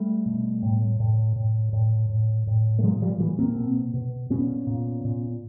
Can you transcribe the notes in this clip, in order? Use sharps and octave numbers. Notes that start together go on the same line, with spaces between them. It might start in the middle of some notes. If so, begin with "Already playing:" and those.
Already playing: G3 A3
B2
A2
A2
A2
A2
A2
A2
A3
A#2 F#3 G#3
F3 G3
A#2 E3 F#3
A#3 C4
B2
B2
A#2 B3 C#4
A#2
A#2